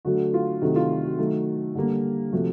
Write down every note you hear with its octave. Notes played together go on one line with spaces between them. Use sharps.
D3 F#3 A3 F#4
F4
C3 D#3 F#3 A3 F#4
F4
F#4
F#4
D#3 F#3 A3
D3 G3 A#3
C3 F3 A3 F#4